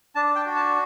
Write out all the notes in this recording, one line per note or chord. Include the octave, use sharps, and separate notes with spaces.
D4 A5
G5
F#4
A5